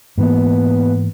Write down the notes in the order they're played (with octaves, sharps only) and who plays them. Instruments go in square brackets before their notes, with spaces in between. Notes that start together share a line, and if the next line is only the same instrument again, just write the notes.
[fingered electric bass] G#2 E3 A#3 [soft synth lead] B3